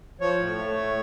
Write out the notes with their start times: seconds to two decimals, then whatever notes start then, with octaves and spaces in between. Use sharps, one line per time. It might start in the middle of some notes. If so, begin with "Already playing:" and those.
0.20 F3 C#5
0.39 A2
0.58 A3
0.77 A2